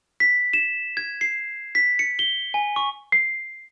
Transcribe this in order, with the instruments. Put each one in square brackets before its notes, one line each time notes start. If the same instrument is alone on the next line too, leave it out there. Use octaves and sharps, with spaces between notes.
[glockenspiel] B6
E7
G#6
C7
B6
C#7
G7
G#5
C#6
[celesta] C7